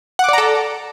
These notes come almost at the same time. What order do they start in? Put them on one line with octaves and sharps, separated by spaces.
F#5 D6 D5 A#5 A4